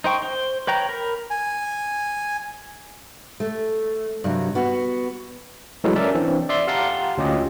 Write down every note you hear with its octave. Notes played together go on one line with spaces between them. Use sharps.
D#4 C5 G5 C#6
C5
B4 C#5 G5 A#5
A#4 B5
G#5
A3
G2 C3 F#3
B3 F#4
E3 F#3 G#3 A3 E4
C#4 A#4 D5 E5 A5
E3 C4 D4
D5 E5 C6
G4 F5 F#5 A5 A#5 C6
D2 C#4 F4 G4 D#5